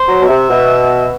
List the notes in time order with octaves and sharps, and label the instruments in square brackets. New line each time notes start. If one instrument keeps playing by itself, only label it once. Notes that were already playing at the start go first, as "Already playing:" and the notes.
Already playing: [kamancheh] C5
[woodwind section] F#3
B2
[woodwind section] C3 [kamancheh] E5
[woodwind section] B2